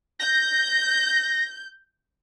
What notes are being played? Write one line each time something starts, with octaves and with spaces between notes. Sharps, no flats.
G6 A#6